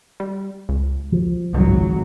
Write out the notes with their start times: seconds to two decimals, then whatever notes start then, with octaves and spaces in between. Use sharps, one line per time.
0.20 G3
0.69 C#2
1.12 F3
1.54 G#1 C#2 F#3